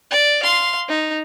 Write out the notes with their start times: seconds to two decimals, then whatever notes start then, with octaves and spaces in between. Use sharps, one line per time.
0.11 D5
0.43 F5 C6
0.89 D#4